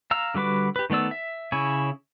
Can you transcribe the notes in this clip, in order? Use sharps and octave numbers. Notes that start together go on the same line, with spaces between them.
F5 A#5 E6
D3 G3 F#4 B4 D6
G4 B4
D#3 A3 B3 D5 E6
E5
C#3 E4 C#5 G#5